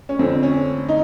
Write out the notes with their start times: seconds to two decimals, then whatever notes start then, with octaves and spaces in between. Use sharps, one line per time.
0.09 C#4
0.19 F2 D3 C4
0.43 C#4
0.89 D#4